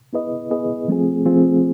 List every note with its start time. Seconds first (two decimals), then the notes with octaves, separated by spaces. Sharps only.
0.13 B3 E4 G#4 B4 D#5
0.50 B3 E4 G#4 B4 D#5
0.88 F3 A3 C4 F4 G#4
1.25 F3 A3 C4 F4 G#4